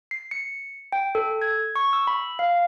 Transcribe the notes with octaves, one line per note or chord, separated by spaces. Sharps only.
C7
C#7
G5
A4
G#6
C#6
E6
B5
F5